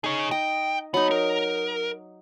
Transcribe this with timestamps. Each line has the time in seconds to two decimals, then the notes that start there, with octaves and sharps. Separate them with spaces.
0.04 D#4 G#4 C#5
0.31 D#5 G5
0.94 F#3 B3 D#4
1.11 A#4